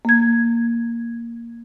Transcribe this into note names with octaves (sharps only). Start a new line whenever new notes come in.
A#3 G#6